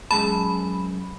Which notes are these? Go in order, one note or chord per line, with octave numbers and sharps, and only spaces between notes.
F#2 G#3 A5 B5